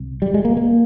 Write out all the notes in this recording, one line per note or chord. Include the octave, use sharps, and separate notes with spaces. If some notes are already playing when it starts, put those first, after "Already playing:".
Already playing: C2
G3
G#3
A#3
A#3